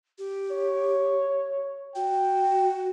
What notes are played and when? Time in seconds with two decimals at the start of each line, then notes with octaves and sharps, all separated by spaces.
0.18 G4
0.52 C#5
1.95 F#4 G5